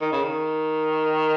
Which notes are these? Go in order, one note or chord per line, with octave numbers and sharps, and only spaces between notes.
D#3
C#3
D#3